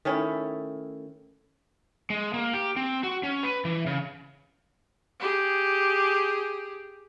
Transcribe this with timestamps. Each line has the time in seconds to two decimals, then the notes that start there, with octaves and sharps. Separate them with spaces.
0.05 D#3 A3 C#4 E4
2.10 G#3
2.34 A#3
2.54 G4
2.76 C4
3.03 F#4
3.23 C#4
3.43 B4
3.65 E3
3.86 C#3
5.20 G4 G#4